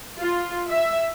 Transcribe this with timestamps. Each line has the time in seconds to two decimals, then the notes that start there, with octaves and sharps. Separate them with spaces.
0.18 F4
0.70 E5